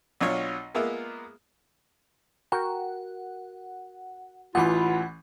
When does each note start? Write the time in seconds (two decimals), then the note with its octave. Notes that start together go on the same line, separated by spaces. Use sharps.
0.21 B1 F#3 D4 F4 C#5
0.75 G#3 A#3 B3 F4 A#4 E5
2.52 F#4 A#4 F#5 G5
4.55 A1 E3 F4 F#5 B5